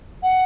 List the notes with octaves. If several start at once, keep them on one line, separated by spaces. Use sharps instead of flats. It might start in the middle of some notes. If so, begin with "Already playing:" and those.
F#5